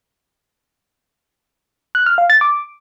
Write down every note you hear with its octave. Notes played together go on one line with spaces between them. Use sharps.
F#6
F6
F5
A6
D6